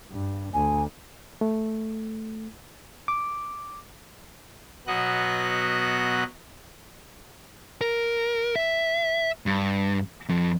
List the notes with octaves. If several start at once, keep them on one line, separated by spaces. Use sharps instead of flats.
G2
D2 G#5
A3
D6
B2 F#3 B3 F#4 D#5 F#6
A#4
E5
G2
F2